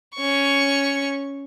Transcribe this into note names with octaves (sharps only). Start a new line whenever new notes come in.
C#4 C#6